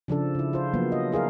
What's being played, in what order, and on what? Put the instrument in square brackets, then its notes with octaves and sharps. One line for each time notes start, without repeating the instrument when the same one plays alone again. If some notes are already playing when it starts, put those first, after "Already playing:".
[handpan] C#3 F3 D4 A4
C#3 E4
F4 C5
F3 F#3 A#3 B3
D#5
E4 G#4 A#4 F5